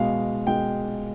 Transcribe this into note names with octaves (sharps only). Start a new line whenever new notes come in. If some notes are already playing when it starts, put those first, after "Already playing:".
Already playing: B2 G#3 F5
B2 G#3 G5